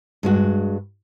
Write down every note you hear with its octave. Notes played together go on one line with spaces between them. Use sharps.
G2 G#3 F#4